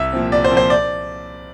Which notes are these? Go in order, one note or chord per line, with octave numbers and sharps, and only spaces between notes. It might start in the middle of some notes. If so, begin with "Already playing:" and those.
Already playing: C2 E5
A#2 F3 C4
C2 D5
C5
A#2 F3 C4
C5
D5